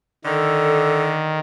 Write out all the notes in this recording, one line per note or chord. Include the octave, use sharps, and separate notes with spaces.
D3 D#3 A4